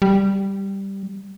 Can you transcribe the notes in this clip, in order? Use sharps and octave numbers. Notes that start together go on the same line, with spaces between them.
G3